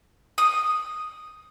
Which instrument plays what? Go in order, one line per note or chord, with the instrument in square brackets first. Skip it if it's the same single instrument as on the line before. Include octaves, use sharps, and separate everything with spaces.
[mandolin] D#6